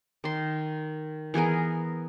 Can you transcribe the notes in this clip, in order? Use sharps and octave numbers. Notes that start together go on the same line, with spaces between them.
D#3 C6
E3 B3 G#4 A#4